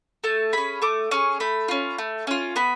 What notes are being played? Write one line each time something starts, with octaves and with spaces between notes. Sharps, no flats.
A3 A5
C#4 G#4 B5
A3 D6
C#4 G#4 C#6
A3 B5
C#4 F4
A3
C#4 F4
B3 B5